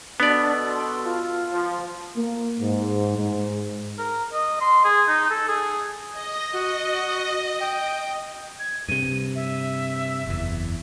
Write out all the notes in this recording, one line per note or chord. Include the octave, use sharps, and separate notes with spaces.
B2 B3 D4 A4 D5
C6
F4
F3
A#3
G#2
G#2
A#4
D#5
C6
G#4
D#4
A4
G#4
D#5
F#4
G5
G#6
G2 C3 D#7
E5
F#1 E2